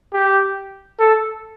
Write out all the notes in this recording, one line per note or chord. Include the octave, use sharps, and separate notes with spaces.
G4
A4